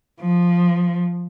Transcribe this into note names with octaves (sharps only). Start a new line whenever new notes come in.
F3